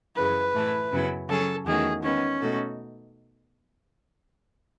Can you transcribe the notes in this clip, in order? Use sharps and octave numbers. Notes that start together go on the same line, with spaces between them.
F#2 C#3 E3 B4
A2 E3 A3 E4
F#2 C#3 F#3 B3 E4
C#3 F#3 C#4 G#4 A4 C#5
E2 D#3 A3 C#4 F#4 G#4
D#3 G#3 B3 C#4
B2 A3 D#4 F#4 A4